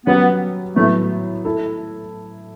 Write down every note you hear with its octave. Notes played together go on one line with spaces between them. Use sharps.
F#3 B3 C#4 G4 B4
A2 F#3 A3 B3
E4 A4